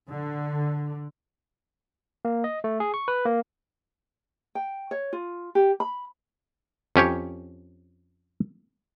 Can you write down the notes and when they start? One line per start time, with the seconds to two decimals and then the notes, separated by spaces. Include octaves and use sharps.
0.10 D3
2.25 A#3
2.44 D#5
2.64 A3
2.80 G#4
2.94 C#6
3.08 B4
3.26 A#3
4.55 G5
4.91 C#5
5.13 F4
5.55 G4
5.80 B5
6.96 F2 C#4 G4 C#5